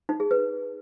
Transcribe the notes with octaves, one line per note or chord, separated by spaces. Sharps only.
D#4
G#4
B4